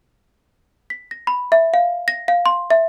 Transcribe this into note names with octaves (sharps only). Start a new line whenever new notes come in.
B6
A#6
B5
E5
F5
A#6
F5
C6
E5